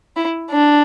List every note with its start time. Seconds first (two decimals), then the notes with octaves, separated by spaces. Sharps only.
0.16 E4
0.51 D4